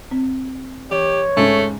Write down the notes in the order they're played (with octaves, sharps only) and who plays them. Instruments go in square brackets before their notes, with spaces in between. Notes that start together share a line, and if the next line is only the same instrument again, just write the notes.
[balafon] C4
[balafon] E3 [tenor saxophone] G4 [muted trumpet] C#5
[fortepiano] G#2 C#3 [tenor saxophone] A3